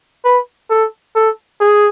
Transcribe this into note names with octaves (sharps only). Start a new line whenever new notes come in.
B4
A4
A4
G#4